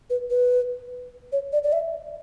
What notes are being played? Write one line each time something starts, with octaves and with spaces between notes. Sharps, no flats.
B4
B4
C#5
D5
D5
E5